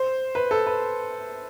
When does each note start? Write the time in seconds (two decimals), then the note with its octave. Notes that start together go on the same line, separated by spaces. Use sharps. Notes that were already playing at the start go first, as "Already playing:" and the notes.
Already playing: C5
0.35 B4
0.51 A4
0.67 B4